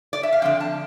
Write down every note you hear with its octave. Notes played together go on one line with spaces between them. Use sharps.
D5
E5
F5
D3 F3 C4 G5
A5